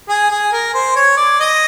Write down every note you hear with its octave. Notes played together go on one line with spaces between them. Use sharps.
G#4
G#4
A#4
C5
C#5
D5
D#5